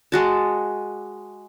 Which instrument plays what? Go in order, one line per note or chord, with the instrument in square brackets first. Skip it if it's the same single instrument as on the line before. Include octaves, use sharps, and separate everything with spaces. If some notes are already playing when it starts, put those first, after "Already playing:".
[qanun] G#3 F#4 A5